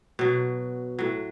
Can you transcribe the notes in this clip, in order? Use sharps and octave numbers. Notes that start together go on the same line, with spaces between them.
B2 F#3
A2 F#3